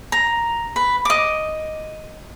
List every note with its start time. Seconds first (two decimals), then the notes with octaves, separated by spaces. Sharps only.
0.12 A#5
0.76 B4
1.05 D#5 D6